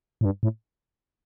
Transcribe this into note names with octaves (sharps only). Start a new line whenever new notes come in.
A2
G2
A2